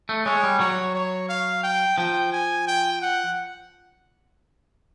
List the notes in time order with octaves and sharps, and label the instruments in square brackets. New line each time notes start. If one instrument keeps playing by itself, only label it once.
[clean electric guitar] A3
[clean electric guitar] G#3 [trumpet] C#5
[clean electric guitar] G3
[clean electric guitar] F#3 [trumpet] C#5
[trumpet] C#5
F5
G5
[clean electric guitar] F3 [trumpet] G5
[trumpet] G#5
G5
F#5